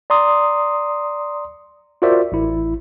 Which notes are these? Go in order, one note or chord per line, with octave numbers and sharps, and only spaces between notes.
D5 A#5 C6 D#6
F4 F#4 A#4 C5 D5 E5
A1 E4